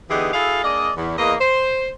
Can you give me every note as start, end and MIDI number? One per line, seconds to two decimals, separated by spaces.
0.10 0.32 50
0.10 0.32 52
0.10 0.32 59
0.10 0.32 63
0.10 0.32 67
0.10 0.32 68
0.33 0.63 64
0.33 0.63 66
0.33 0.63 68
0.33 0.63 69
0.33 0.63 77
0.64 0.90 58
0.64 0.90 62
0.64 0.90 68
0.64 0.90 74
0.64 0.90 75
0.96 1.14 40
1.17 1.34 40
1.17 1.34 58
1.17 1.34 75
1.40 1.89 72